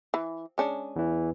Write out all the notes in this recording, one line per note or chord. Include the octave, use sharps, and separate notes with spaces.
E3
G#3 C#4 D4
E2 E3